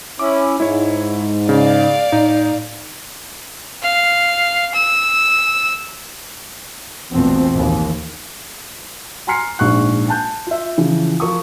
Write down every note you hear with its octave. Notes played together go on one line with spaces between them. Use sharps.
C#4 E4 D6
G#2 G#3 E4 C#5
C#3 D5 F5
A2 D#4
F5
E6
A#1 E2 B2 F3 A3 C4
A1 D#2 E3
G#5 A#5 C6 F6 C7 C#7
A#1 G#2 C#6 F#6
G#5 A5 F#6 G6
F4 E5
C#3 E3 F3
F3 A#4 C#6 D#6